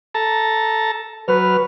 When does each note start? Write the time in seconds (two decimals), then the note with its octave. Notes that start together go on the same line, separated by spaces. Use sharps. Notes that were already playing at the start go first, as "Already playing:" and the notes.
0.15 A4 A5 A#5
1.28 F#3 B4 F6